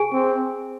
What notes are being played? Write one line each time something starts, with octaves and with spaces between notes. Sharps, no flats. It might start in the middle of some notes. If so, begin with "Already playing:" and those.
Already playing: G#4 G#5
C4